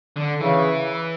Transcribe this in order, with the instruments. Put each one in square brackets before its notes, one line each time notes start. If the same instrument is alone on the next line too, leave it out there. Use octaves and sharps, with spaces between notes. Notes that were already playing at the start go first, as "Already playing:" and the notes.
[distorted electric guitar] D3
[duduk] C#3 [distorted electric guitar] E3